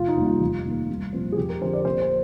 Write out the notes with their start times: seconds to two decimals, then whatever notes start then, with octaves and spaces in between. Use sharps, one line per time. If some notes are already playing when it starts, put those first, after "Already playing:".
Already playing: F1 F4
0.08 D#4
0.17 D#2 D#3 G3
0.25 F4
0.41 F1
0.65 D#2 D#3 A#3
0.89 C2
1.13 A#2 F3 C4
1.32 G#4
1.38 F2 G4
1.49 A#4
1.61 D3 F3 C4 C5
1.73 D5
1.85 A#1 C5
2.02 C5